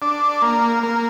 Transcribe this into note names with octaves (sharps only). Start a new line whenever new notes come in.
D4
A#3
A#3